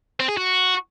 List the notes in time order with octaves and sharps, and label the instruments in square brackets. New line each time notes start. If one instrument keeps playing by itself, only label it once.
[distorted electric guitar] C4
G#4
F#4